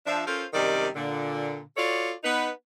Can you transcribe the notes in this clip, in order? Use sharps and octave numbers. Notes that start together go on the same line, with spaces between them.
F3 D4 E5
C#4 F4 A4 A#4 C5
F#2 C3 D#3 G3 A#4 D5
A#2 D3
F4 F#4 A4 C#5 D5
B3 D#4 B4